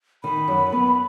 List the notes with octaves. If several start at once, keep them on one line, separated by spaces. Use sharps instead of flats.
D#3 B5
F#2
B3